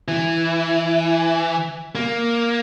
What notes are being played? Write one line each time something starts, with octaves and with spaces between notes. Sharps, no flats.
E3
A#3